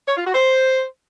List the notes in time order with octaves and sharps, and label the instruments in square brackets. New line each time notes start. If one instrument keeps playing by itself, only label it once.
[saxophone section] C#5
F4
F#4
C5